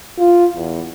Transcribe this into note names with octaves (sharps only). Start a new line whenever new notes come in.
F4
E2